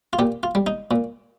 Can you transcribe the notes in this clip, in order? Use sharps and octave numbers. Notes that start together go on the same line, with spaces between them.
F4
A#2 G4
F4
G3
D#4
A#2